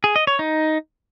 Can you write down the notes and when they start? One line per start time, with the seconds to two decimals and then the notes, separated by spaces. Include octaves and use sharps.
0.04 G#4
0.16 D#5
0.27 C#5
0.39 D#4